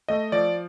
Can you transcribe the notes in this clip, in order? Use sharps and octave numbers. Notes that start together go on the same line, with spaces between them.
A3 D#5
F3 D5